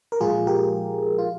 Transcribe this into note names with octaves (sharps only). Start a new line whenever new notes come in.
A#4
A#2 F3 G#3 F4 G#4
G4 A#4
F4